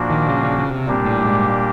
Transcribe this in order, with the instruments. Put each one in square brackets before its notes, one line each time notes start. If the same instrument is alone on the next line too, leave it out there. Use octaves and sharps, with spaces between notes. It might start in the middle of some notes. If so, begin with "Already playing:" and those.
Already playing: [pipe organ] A#2 F3 A#3 D4 F#4
[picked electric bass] D#3
C#3
C#3
C#3
C3
[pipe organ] A#2 G3 A#3 D4 G4
[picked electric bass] A2
G#2